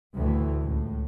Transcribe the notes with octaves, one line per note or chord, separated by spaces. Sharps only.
D2 A2 E3
C#2 A2